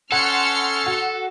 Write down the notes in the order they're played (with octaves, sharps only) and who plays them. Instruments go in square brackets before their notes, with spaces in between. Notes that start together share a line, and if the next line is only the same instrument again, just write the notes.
[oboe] C#4 [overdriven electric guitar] A4 [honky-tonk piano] F#5 [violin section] C6 F6 C#7
[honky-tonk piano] F#4